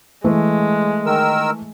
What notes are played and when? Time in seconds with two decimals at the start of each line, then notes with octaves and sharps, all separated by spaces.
0.24 E3 G#3 A3
1.06 D#3 A#4 E6